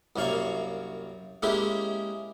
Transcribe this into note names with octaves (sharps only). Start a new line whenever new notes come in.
C2 F#2 A#3 C#5 F5 C#6
G#3 A#3 C#4 E4 G4 G#4